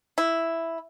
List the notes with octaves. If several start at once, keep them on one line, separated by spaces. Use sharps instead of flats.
E4